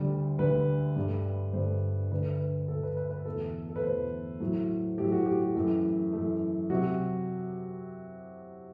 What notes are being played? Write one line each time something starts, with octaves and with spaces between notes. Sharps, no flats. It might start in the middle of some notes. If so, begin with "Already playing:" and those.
Already playing: D2 D3 G3
D2 D3 G3 B4
G2 D3 A3
G2 D3 A3 C5
D2 D3 A3 B4
B4
D2 D3 A3 A4
B4
B4
B4
E2 B2 A3 A4
A4
B4
E2 B2 A3 C5
A2 F#3 A3
A2 F#3 A3 G4
F#4
G4
G4
F#2 E3 A3
F#2 E3 A3
C3 F#3 F#4